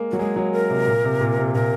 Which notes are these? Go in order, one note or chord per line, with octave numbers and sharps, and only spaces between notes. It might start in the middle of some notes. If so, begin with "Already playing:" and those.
Already playing: G#3 A#3
F#3 F#4
G#3 G#4
F#3
A#4
C3
A#2
C3
A#2
C3
A#2 A#4